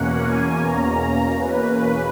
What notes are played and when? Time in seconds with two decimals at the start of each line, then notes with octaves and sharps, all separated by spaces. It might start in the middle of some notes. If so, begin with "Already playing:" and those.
Already playing: E2 B2 A#3 C#4 F#5
0.23 G#5
0.61 A#5
1.38 B4